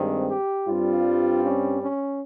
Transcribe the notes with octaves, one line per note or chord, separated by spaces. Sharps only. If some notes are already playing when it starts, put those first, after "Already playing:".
Already playing: G2 D#3 G#3 C4
G4
G2 G3 C4 F4
C#4
C#4